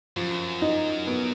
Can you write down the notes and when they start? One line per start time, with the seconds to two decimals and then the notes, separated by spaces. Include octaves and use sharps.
0.16 F#2 F3
0.62 D#4
1.06 B3